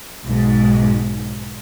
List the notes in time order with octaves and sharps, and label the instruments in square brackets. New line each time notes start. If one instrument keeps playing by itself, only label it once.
[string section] B1 G#2